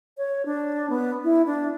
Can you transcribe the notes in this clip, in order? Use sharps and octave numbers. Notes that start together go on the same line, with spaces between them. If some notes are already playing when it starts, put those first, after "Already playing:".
C#5
D4
B3
E4
D4